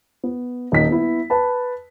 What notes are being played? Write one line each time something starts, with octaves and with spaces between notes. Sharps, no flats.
B3
D#1 D#4 B6
B3 E4
B4 A5 B5